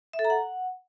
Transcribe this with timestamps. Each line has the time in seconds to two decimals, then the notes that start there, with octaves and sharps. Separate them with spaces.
0.13 E5
0.19 A4
0.25 A#5
0.30 F#5